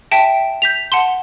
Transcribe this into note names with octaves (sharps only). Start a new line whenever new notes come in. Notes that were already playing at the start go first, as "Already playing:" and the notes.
E5 G5 A5
G6 B6 F7
F#5 A5 C6